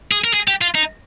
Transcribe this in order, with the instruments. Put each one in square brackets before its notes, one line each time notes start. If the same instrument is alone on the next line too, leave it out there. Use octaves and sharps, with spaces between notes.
[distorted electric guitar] G#4
A#4
G#4
G4
F4
D#4